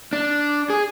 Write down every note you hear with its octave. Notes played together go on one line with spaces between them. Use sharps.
D4
G#4